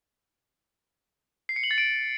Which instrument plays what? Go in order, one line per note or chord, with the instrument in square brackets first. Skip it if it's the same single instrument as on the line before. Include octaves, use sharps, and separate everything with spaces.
[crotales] C7
C#7
F#7
A6
D7